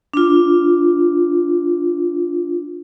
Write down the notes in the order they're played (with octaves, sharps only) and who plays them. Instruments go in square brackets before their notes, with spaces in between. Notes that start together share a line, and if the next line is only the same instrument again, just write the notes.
[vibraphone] D4 F4